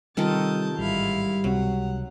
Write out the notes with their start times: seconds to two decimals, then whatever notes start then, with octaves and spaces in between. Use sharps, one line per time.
0.17 C3 D#3 G3 F4 A4 A5 D#6 G6
0.78 A1 G#2 G3 E4 F5
1.44 C#2 C3 F#3 C4 F#5